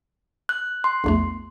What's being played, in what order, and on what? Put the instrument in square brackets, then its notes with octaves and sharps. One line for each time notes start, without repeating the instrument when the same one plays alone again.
[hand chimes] F#6
C6
[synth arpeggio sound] A#1 E2 A3